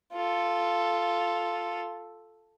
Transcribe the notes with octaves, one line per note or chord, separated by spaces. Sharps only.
F4 A4